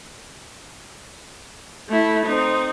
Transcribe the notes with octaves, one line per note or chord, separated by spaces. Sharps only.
A3 E4
C4 D#4